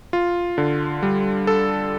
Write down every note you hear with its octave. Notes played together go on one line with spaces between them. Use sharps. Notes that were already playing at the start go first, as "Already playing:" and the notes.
F4
D3
G3
A4